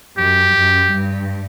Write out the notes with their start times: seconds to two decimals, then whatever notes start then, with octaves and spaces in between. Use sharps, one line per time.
0.18 F#2 G4
0.55 F#2
0.92 G2